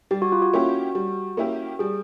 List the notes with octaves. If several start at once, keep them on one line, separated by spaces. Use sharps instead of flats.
G3 G4
F#4
F4
F#4
A#3 C#4 E4 G4
G3
A#3 C#4 E4 G4
G3 G#4